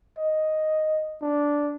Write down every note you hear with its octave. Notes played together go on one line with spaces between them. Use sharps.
D#5
D4